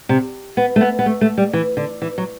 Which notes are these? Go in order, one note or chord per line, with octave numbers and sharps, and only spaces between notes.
C3
B3
A3
B3
B3
A3
A3
G3
E3
D3
E3
F#3